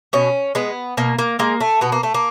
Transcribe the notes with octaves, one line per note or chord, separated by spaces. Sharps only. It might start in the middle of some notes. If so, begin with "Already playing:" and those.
B2 C#4
G#3 B3
B2 A#3
A#3
G#3 A#3
A3
B2 B3
A#3
A3
A#3